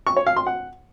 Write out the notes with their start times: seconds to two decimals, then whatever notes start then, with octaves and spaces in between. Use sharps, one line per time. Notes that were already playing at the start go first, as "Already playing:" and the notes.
0.07 C#6
0.17 C#5
0.27 F5
0.37 C6
0.47 F#5